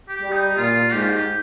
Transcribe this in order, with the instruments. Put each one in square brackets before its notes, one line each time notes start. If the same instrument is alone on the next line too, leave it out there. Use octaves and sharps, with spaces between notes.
[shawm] G4
[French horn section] G3
[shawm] D#4
[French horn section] A#2 [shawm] F4
[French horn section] G#2 [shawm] G4
[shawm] F4
G4